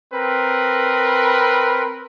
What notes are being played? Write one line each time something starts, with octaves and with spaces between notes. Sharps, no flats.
C4 A#4 B4